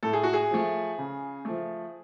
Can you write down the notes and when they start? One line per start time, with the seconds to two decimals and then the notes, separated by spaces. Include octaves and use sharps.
0.03 A2 A4
0.13 G#4
0.23 F#4
0.33 G#4
0.51 F3 A3
0.98 C#3
1.45 F3 A3